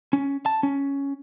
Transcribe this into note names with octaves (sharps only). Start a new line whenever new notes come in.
C#4
A5
C#4